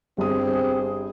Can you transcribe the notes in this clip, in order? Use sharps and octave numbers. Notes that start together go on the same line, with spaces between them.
G1 C4 G4 G#4 D#6